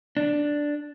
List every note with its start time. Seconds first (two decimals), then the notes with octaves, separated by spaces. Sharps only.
0.17 D4